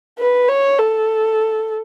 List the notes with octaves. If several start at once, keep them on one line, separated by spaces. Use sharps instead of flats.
B4
C#5
A4